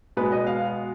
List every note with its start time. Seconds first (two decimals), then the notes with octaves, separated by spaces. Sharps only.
0.17 B2 G#3 B3 B4
0.32 D#5
0.47 F5